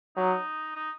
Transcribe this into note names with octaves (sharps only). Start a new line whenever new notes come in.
F#3 D#4
D#4